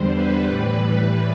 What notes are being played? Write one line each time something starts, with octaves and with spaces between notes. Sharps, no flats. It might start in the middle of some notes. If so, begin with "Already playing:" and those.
Already playing: E2 D3 G3 C5
B4
A2 E3 G3
B4